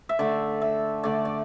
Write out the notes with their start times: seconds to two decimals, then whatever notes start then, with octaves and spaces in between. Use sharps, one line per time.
0.09 E5
0.19 D3 A3 D5
0.62 E5
1.03 D3 A3 D5
1.25 D5